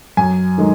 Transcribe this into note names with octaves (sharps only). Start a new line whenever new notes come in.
F#2 G#5
D#3 G#3